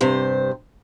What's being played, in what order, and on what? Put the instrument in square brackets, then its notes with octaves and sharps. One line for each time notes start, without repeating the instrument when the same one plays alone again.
[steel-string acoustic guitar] G2 C3 C5